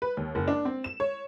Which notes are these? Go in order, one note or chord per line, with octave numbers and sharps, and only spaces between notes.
B4
D#2
F#1
D4
C4
E7
C#5